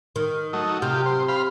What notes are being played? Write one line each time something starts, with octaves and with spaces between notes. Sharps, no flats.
D#3
F#3 A3 D#4
C3 F4 G4
C5
C5 F5 B5